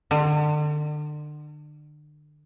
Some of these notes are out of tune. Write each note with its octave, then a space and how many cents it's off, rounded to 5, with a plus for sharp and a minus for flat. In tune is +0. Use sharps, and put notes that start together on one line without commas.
D3 +35